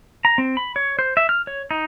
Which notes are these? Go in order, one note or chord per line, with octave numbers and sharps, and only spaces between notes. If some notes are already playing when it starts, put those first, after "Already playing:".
A#5
C4
B5
C#5
C5
E5
F6
C#5
D#4